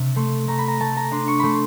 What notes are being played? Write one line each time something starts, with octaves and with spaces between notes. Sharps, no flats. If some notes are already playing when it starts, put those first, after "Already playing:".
Already playing: C3 D4
A3 C6
A3 A#5
B5
A#5
A3 A5
A#5
D4 C6
C#6
A3 B5 C6